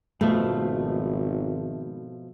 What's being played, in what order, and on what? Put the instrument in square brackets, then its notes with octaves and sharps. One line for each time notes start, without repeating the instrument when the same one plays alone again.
[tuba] G#1 [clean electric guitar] B2 F3 [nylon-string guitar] A3